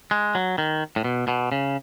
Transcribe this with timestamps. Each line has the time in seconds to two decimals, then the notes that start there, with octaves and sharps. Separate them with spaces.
0.11 G#3
0.35 F#3
0.58 D#3
0.96 A2
1.04 B2
1.28 B2
1.52 C#3